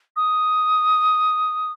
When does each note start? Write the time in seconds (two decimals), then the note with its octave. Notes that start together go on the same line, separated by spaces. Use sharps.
0.16 D#6